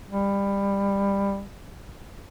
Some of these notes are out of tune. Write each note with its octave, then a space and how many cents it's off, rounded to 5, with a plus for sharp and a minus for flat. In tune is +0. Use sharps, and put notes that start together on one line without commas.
G3 +20